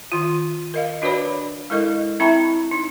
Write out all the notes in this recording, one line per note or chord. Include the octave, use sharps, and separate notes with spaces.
D#3 F4
A#4 D#5 F5
D4 F#4 B4 C#5 D5 B5
G#3 E4 A4 A#4 D#5
C4 E4 E5 G5 A#5 B5
D#4